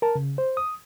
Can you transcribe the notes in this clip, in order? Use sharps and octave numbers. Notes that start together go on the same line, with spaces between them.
A#4 A5
C#3
C5
D#6